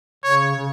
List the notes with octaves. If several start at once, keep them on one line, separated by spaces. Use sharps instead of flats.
C#3 C#5
C#3